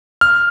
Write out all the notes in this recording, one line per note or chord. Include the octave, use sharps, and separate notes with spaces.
F6